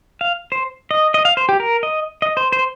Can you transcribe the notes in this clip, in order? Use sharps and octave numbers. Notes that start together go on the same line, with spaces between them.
F5
C5
D#5
D#5
F5
C5
G4
A#4
D#5
D#5
C5
C5